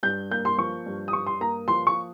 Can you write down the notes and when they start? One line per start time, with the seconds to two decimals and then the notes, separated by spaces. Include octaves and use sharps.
0.03 G2 G6
0.31 A#3 G6
0.45 C6
0.58 F3 C#6
0.86 G2
1.08 D#6
1.13 G2 C#6
1.27 C6
1.40 A#3 A#5
1.68 F3 C6
1.87 C#6